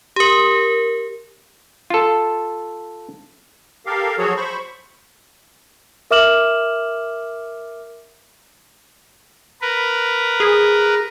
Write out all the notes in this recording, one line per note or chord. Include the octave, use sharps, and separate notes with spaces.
G4 A#4
F4 A4
G4 A4 A#4 F5
F3 F#3 F#4 G#4 A4 C#5
C5 B5 C#6
A#4 E5 D6 F6 E7 F#7
A#4 B4
G#4